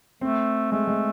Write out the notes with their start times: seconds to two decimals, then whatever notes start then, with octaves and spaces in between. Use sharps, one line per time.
0.21 A3 C4
0.72 G#3 A3
0.88 G#3